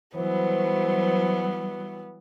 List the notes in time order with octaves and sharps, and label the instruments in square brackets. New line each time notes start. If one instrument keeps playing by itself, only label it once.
[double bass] E3 [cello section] F#3 G3 [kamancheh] B3 [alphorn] C5